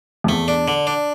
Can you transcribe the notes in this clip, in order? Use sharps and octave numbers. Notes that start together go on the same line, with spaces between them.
F2
E2 A3
D4
D3
D4